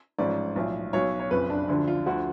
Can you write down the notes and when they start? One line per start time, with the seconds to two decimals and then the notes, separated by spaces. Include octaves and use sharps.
0.18 A1 G#2 F3 D5
0.56 B1 A2 F3
0.93 B1 B2 C#5
1.20 C#5
1.31 F#1 F2 F3 B4
1.50 D4
1.68 D2 D3 F3 D4
1.87 F4
2.06 D2 D3 F3 F#4